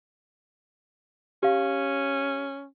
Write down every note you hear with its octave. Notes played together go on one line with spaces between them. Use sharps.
C#4 G4 F5